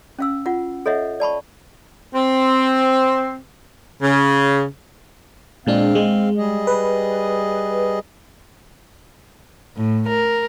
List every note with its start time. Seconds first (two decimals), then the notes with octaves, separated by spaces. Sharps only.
0.19 C#4 F5 E6
0.46 F4 F#5
0.86 A4 C#5 D#5 E5 F#5
1.20 D5 A5 B5 C#6
2.15 C4
4.02 C#3
5.66 A#2 G#3 C4 D4 F5
5.95 G#3
6.37 G3 G#4 D#5
6.67 B4
9.75 A2
10.09 A#4